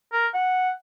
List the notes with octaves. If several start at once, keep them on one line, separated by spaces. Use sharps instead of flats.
A#4
F#5